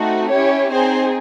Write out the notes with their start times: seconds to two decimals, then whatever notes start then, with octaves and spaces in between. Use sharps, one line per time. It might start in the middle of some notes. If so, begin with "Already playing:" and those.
Already playing: A3 C4 D#4 F#4
0.32 C#4 E4 G4 C#5
0.72 C4 D#4 G#4 C5